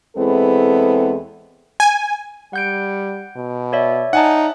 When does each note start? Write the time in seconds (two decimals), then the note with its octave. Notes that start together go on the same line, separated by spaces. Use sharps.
0.17 E2 G#3 B3 C4 E4 A4
1.80 G#5
2.53 G3 F#5 G6 D7
3.36 B2
3.73 C#5 D5 E5
4.13 D#4 F#5 G#5 A5